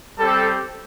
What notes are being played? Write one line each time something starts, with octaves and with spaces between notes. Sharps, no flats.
G3 C4 G4 A4